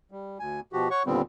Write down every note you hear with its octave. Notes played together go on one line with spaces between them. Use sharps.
G3
D2 G#5
B2 F3 F#4 G4
C#5 F#5 C#6
D#2 A#2 D3 G3 B3 C4